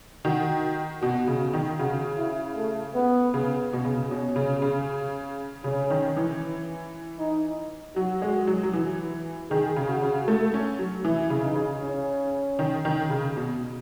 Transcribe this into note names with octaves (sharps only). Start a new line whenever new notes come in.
D#3 F#4
B2 F#4
C#3
D#3
C#3 F#4
E4
A3
B3
C#3
B2
C#3
B2 C#4
C#3
C#3
C#3 C#4
D#3
E3
D#4
F#3 F#4
G#3
F#3
F#3
E3
D#3 G#4
C#3
F#4
C#3
A3
C#4
F#3
E3 E4
C#3
D#4
C#3
C#4
D#3
D#3
C#3
B2